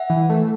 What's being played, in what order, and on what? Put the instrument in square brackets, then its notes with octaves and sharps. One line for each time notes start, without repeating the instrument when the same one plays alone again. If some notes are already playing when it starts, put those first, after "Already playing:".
Already playing: [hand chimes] E5 F#5
[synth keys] E3
A3